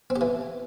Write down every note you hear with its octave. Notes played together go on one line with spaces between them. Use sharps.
C4
G4
E3